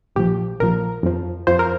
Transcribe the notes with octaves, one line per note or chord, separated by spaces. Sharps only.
A#1 A#2 F3 G4
A#1 A#2 F3 A#4
F2 F3
F2 F3 C5
A#4